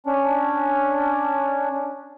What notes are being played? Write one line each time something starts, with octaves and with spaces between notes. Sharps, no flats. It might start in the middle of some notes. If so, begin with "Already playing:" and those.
C#4 D4